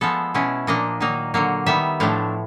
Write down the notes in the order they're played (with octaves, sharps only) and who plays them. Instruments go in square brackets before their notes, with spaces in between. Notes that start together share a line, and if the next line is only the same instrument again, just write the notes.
[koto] F3 G#3 B3 A4
B2 G#3 C#4 E4
A#2 F3 A#3 D4 D#5
D#3 F#3 A#3 D#4
D3 F#3 A#3
D#3 G3 B3 E5
A2 F3 A3 D4